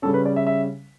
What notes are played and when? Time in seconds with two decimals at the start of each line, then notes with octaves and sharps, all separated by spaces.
0.02 C#3 G3 C#4 A4
0.14 B4
0.25 D5
0.36 E5
0.46 E5